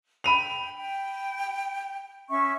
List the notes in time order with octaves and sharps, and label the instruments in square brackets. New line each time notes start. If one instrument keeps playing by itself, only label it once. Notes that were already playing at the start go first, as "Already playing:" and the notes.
[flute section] G5 [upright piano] B5 D#7 F7
[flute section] G5
C#4 E5 C#6